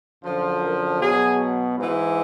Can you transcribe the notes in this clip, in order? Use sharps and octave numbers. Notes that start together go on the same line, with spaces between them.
F#2 D3 F3
A#4
B2 F#3 G#4
G#2 E3